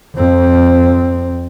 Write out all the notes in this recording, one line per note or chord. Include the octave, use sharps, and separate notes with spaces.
F2 C4